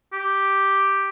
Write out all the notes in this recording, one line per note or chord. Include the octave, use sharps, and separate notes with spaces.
G4